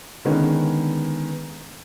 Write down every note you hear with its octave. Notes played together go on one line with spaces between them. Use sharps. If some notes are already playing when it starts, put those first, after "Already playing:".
D3 D#3 G#3 B3 C#4